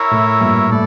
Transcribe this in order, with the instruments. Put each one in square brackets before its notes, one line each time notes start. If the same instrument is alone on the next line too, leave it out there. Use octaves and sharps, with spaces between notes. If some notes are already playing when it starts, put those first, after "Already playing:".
Already playing: [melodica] E4 A#4 C#5 E5
[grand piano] A2
G2 A#2
[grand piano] A2 [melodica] E4 A4 D5